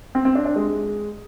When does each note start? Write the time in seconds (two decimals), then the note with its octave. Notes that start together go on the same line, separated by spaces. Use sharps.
0.15 C4
0.25 C4
0.35 D4
0.46 D4
0.56 G#3